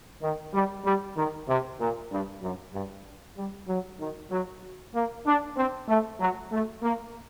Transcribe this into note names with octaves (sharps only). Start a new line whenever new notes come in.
D#3
G3
G3
D#3
C3
A#2
G2
F#2
G2
G3
F#3
D#3
F#3
A#3
D4
C4
A3
F#3
A3
A#3